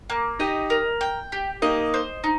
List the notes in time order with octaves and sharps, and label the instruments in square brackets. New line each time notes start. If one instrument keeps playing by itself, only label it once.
[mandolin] A#3
[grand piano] D#4 G4 [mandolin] D#5
[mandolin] A#4
G5
G4
[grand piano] A#3 D#4 [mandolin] D#5
[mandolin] C5
D#4